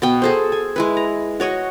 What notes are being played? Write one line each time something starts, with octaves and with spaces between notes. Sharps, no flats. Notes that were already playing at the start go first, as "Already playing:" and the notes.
B2 B3 G5
G#4 A4 C5
G#5
G#3 E4 B4
A#5
F#4 C#5 D#5 F#5